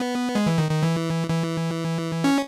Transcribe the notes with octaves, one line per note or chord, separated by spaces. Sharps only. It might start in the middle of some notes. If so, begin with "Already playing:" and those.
Already playing: B3
G#3
E3
D#3
D#3
E3
E3
C#4